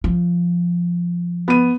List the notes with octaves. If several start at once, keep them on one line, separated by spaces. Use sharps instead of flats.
F3
B3 D#7